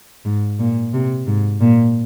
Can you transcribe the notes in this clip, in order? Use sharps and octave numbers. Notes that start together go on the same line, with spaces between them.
G#2
A#2
C3
G#2
A#2